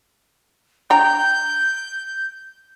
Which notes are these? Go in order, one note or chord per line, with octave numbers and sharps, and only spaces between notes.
D4 G5 A#5 G6